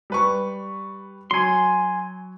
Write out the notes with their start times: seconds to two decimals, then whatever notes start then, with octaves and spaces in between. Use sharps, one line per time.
0.10 G3 B4 C#6
1.31 F#3 G#5 C6